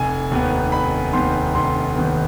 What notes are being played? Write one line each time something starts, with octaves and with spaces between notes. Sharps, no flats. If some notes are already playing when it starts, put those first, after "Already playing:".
Already playing: F1 G#5
D#2 D#3 B3
F1 B5
D#2 D#3 B3 C6
F1 C6
D#2 D#3 B3